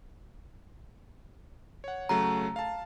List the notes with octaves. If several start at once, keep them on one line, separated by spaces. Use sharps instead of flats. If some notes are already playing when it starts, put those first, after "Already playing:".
C#5 F#5
C#3 F#3 A3 A#5
F5 A5